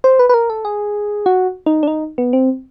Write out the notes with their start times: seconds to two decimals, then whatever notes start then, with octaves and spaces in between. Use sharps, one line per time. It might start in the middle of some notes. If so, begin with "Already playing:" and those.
0.04 C5
0.19 B4
0.29 B4
0.34 A#4
0.50 A4
0.65 G#4
1.26 F#4
1.66 D#4
1.83 D4
1.88 D#4
2.18 B3
2.33 C4